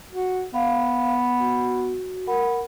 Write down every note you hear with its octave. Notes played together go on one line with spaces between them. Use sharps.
F#4
B3 F5
F#4
A#4 F#5 B5